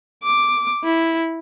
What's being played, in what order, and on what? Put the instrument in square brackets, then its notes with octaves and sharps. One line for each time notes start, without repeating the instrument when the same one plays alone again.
[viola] D6
E4